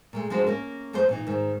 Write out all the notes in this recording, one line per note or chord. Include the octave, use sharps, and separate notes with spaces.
A#2 G#3 A3
F3 F#3 G#3 D4 F#4 C5
A#3 C#4 A#4
F#2 A3 B3 F4 C5
A#2 E3 D#4
G#2 D#3